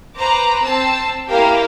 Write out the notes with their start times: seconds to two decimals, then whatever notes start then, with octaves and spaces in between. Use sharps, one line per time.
0.17 B4 C5 A#5 D6
0.62 C4 A5 E6
1.27 A#3 E4 G4 A#4 F5 G5